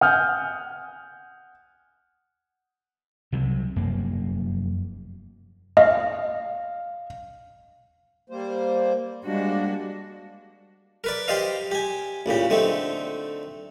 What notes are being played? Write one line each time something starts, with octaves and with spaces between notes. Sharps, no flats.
F#5 G#5 D#6 F6 G6
C2 C3 F#3
F1 F#2 A#3
D#5 F5
G3 A#3 C5
G3 G#3 A#3 D4 F#4
A#4 B4 D5
G4 C5 D5 D#5 F5
G4 G#5
A1 A#2 C#3 G4
D3 A3 C4 D#4